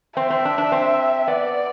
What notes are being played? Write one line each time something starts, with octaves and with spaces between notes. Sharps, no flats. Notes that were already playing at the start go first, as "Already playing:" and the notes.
C4 E5
C4
D4
D4
C4
B3 D5